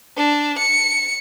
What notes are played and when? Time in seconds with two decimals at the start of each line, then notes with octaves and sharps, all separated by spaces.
0.17 D4
0.58 C#7